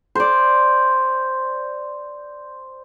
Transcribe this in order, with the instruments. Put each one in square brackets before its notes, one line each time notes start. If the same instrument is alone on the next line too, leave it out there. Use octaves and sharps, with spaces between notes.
[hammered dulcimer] C5 D5